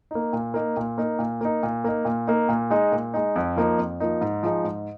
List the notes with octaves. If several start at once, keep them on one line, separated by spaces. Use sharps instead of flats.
A#3 D#4
A#2
A#3 D#4
A#2
A#3 D#4
A#2
A#3 D#4
A#2
A#3 D#4
A#2
A#3 D#4
A#2
G#3 D#4
A#2
G#3 D#4
F2
F3 A#3 D#4
F2
F3 A#3 D#4
G#2
F3 G#3 D#4
G#2